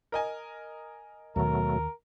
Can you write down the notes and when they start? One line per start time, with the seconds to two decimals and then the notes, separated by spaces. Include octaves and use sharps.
0.12 A#4 D#5 G#5
1.36 D#2 B2 D#3 F#3 A3 A#4